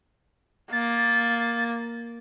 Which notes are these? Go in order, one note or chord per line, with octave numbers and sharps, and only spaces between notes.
A#3 A6